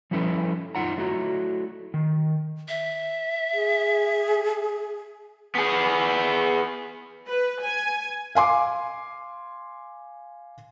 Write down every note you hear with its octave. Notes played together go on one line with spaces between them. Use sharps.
F3 G3 C#4 E4 A4 B4
F#2 D#4 F4 F#5 A#5
F#3 A3 E4 F#4 A#5
D#3
E5
G#4
B3 G#4
B4
G#5
F5 G#5 C6 D6